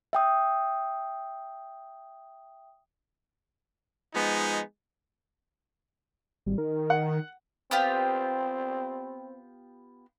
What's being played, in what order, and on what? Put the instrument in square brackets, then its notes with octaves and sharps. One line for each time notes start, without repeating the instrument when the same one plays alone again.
[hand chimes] E5 G5 D#6
[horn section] F3 G#3 B3 D#4
[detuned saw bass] G#1 [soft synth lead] G3
[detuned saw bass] D#3 [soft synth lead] A#4
[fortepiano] F#5
[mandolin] B3 F4 G4 [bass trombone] C4